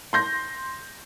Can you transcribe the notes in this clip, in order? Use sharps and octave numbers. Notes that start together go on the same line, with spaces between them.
C6 G6 A#6